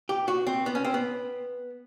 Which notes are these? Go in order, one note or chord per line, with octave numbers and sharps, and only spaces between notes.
G4
F#4
C4
B3
C#4
C4
B3